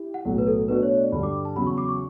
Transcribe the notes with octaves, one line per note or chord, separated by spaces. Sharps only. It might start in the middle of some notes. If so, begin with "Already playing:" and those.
Already playing: E4 G4
F#5
B1 A2 F#3
B4
A4
B2 A3 D4 F#4 B4
C#5
D5
G2 D3 G3 B5
D6
A5
E2 C#3 F#3 B5
C#6
D6
C#6